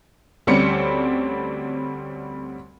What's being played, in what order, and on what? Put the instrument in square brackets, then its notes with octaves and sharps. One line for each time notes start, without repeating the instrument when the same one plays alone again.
[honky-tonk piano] D2 G3 C4 C#4 D5 C#7